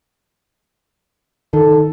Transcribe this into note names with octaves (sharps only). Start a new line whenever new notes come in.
D#3 A4